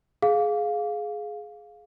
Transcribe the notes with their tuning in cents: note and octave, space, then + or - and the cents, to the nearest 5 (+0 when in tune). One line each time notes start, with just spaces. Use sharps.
G#4 +15 F5 +10